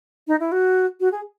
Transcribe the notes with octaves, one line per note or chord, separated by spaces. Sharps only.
D#4
E4
F#4
F#4
G#4